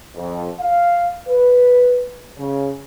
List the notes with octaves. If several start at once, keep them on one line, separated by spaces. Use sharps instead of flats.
F2
F5
B4
C#3